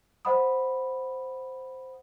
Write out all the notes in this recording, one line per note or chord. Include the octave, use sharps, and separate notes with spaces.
C5 D#5 F#5 B5 D#6